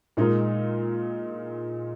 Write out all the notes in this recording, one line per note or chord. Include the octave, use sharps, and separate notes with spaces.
A#2 G#3 D#4 A#4